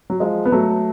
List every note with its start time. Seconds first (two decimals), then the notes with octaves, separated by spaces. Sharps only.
0.10 F#3
0.20 F3 G#3
0.45 B3
0.52 F#3 A3